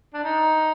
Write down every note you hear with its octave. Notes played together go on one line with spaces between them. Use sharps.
D4
D#4